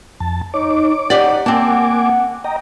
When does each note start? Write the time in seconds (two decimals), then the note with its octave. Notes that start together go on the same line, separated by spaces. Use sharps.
0.20 F2 A5
0.54 D#4 C#5 D6
1.10 D#4 G4 D5 F#5
1.46 A#3 C4 G#5 A5 D6
2.44 D#5 G5 A#5